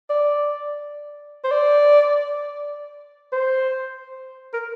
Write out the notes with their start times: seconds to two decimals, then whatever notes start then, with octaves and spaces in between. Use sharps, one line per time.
0.10 D5
1.44 C5
1.51 D5
3.33 C5
4.54 A#4